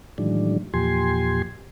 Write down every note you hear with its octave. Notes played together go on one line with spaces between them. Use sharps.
A2 D#3 E3 F#3 G#3 D4
E2 A#2 F3 G4 G#5 C6